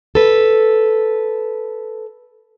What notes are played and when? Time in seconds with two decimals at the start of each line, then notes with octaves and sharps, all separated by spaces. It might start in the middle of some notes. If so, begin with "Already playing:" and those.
0.15 A4 B4